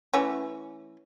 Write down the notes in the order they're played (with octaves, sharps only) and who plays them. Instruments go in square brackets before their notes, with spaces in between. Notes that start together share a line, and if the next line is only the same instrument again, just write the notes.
[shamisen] E3 A3 C#4